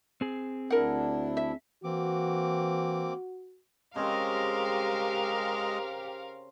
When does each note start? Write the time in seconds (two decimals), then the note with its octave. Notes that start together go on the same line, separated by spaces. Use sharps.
0.21 C4 G#4
0.70 D2 D4 E4 A#4 F#5
1.37 E5
1.84 E3 A#3 C4 F#4 D6
3.96 C#3 G#3 C4 G4 A#4 D#5 F5